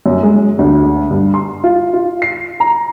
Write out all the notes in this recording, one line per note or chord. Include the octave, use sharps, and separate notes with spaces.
F#2
G#3
D2
G2
C6
F4
F4
C7
A#5